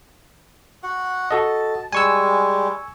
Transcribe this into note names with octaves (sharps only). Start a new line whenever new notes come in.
F#4 F#5
F#4 A4 D#5 A5
G3 G#3 G#5 C#6 E6